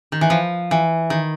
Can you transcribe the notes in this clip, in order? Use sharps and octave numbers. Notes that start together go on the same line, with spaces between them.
D#3
E3
F3
E3
D#3